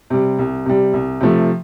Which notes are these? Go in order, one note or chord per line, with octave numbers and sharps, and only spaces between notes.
C3 G3
C2
C3 G3
C2
C3 F3 A3